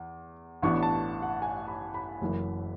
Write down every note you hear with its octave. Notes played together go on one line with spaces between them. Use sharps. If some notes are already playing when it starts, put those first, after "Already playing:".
Already playing: E2
A1 A2 E3 B3 D4 C#6
A5
F#5
G#5
B5
B5
F#1 F#2 E3